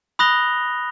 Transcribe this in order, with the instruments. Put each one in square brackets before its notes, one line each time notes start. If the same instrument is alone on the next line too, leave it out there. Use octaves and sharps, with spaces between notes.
[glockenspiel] B5 D#6 F#6 A#6 F7 G7